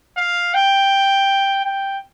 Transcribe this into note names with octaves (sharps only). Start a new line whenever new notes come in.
F5
G5
G5